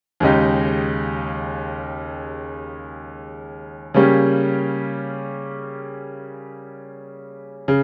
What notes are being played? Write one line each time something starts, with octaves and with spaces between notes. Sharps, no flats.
D#2 C#3 G#3 D#4 G4
C#3 G3 A#3 C#4 G4
C#3